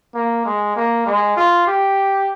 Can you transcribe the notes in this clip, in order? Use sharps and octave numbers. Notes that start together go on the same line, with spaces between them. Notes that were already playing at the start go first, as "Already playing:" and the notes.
A#3
G#3
A#3
G#3
F4
G4